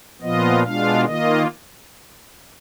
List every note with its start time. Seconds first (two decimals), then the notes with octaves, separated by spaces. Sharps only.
0.21 A#2 F3 B3 F4 D#5
0.63 B2 G#3 D4 F4 F5
1.05 D#3 A#3 F4 D#5